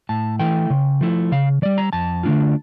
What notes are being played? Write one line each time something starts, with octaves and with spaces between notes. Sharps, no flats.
A2 A5
E3 A3 E4 G5
C#3
F3 A3 E4
C#3 F5
E3 G3 D5
A#5
F2 A5
D3 A3 D4 F4